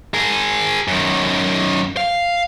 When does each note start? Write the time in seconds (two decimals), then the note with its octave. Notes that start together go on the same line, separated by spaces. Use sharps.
0.14 G#4 A#4
0.88 F#2 D#3
1.97 F5